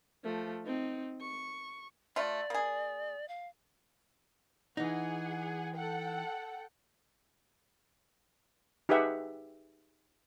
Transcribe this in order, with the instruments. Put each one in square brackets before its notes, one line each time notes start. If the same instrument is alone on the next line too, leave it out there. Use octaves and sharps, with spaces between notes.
[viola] F3 A3
C4 D#4
C#6
[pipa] A3 F4 [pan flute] D5
[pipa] A#3 G#4
[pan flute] F5
[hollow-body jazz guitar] E3 D#4 [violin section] G#4 F#5
[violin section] A4 F#5 G5
[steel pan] D#4 G4 G#4 B4 E5 F#5